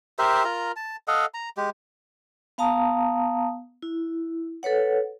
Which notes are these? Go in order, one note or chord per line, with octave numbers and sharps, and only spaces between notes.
G4 A#4 C5 E5
F4 A#4 A#5
A5
A4 D#5 F5 F#5
A#5
G#3 G4
B3 F5 A5 A#5 D#6
E4
A4 B4 C#5 F#5